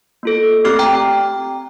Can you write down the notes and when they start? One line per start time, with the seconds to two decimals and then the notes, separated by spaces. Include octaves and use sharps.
0.23 A#3 F4 A4
0.65 A3 C4 G4 D6 F6
0.79 G5 A#5